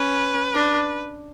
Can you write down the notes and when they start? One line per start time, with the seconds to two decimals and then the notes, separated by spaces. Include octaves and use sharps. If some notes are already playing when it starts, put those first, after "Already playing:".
Already playing: C#4 B4
0.54 D4